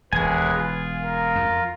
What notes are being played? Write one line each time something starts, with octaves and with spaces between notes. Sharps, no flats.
E1 D#2 G#3 G#4 B4 G#5
F4
A#4
F2